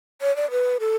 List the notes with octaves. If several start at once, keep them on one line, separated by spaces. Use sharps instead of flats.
C#5
D5
B4
A4